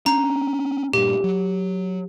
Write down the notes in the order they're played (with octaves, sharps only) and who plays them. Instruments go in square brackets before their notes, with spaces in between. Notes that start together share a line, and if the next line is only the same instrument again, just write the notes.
[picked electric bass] C#4 D4 [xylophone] A#5
[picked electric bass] G2 A#2 [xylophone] G4
[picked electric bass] F#3